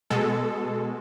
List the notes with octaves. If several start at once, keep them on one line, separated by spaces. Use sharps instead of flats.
B2 G#3 A4